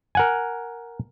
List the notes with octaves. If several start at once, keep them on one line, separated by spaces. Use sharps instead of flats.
A#4 F#5 G#5